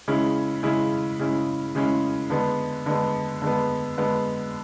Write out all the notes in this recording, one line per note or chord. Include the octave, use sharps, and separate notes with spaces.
C#3 G#3 C#4 E4
C#3 G#3 C#4 E4
C#3 G#3 C#4 E4
C#3 G#3 C#4 E4
D3 G#3 B3
D3 G#3 B3
D3 G#3 B3
D3 G#3 B3